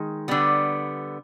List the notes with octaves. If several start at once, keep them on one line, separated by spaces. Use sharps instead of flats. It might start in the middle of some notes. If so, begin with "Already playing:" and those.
Already playing: D#3 G#3
D3 G3 B3